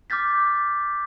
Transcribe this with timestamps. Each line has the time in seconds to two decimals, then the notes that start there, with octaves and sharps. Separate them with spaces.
0.10 D6 F6 G6 A6 B6